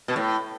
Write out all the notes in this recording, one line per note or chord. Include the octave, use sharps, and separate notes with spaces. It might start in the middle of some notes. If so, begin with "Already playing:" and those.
B2
A2